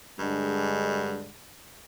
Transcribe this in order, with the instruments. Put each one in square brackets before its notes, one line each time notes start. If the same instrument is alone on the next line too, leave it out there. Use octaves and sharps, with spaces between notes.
[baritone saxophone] G2 [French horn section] D3 G#3